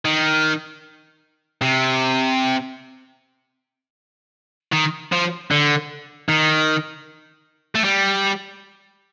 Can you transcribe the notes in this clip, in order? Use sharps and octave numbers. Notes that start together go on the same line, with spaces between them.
D#3
C3
D#3
F3
D3
D#3
A3
G3